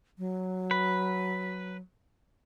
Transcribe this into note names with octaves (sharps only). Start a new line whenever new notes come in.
F#3
B4